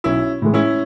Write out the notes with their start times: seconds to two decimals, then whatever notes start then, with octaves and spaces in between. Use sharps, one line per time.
0.04 B1 C#4 E4
0.42 A2 E3 G#3
0.54 C#4 E4